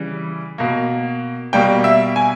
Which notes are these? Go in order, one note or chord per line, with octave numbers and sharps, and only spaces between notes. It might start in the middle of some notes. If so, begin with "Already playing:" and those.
Already playing: C#3 E3 G3
B2 A#3
B2 G3 A#3 G5
E5
G#5